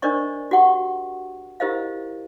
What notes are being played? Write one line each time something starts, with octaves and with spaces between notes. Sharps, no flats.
D4 A#4 C5 D5 D#5 C#6
F#4 G4 F#5 C#6
E4 G4 A#4 C5 D#5 F5